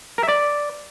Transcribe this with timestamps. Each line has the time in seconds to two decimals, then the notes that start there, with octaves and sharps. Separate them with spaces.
0.18 A#4
0.23 E5
0.28 D5